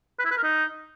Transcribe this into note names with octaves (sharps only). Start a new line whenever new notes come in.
B4
E4
B4
A#4
D#4